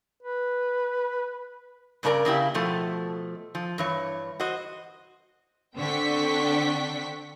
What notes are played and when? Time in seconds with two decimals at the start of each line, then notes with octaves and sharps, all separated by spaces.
0.23 B4
2.03 G2 C#3 C#4 D4 A#4 D5
2.25 C#3 A#3 E4 G4
2.54 B2 F3 A3
3.55 F3
3.78 G2 E3 C#5
4.40 F#4 C5 D#5
5.76 D3 C4 D4 G5 C#6 B6